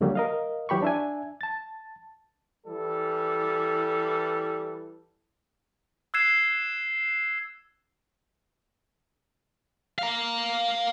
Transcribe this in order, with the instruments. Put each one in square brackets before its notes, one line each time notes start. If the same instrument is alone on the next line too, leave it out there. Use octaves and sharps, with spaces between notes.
[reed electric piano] C#2 D3 F#3 G3 A#3
A#4 D#5 F5
E3 F#3 G4 B5 C#6
D4 E5 G#5
A5 A6
[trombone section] E3 G3 A4
[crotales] E6 F#6 G#6 C7 E7
[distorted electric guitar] F5 A#5